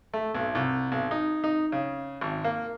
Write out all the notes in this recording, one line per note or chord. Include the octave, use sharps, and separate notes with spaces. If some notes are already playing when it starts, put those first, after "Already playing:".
A3
B1
C2
B1
D#4
D#4
C#3
G#1
A#3